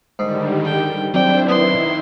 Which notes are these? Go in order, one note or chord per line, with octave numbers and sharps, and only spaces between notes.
G#2 D3 D#3 G3
G5
F#3 C4 D4 E4 C5 D5 G5
D#3 B3 E4 C6